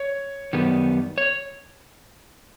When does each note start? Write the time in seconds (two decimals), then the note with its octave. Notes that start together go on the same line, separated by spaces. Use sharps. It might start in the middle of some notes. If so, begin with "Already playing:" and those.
Already playing: C#5
0.53 F#2 D#3 G3 B3
1.18 C#5